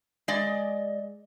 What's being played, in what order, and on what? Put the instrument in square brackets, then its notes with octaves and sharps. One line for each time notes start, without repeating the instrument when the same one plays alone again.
[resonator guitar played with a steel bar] G#3 D5 D#5